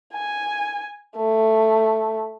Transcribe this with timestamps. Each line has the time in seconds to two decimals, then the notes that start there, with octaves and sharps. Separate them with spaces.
0.13 G#5
1.17 A3